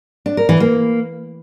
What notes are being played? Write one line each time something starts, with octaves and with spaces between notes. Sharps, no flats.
D4
A#4
E3
A#3